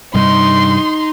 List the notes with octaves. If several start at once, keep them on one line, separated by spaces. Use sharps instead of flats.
G2 C3 G3 D#4 D#5 C6